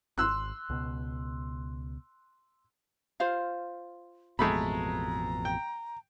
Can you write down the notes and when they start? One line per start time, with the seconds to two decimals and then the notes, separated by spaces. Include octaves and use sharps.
0.18 G#1 C6 E6 F#6
0.70 C#2 B2
3.20 F4 C5 F5
4.39 A1 F2 B2 G#3 A3 A#5 B5
5.45 G5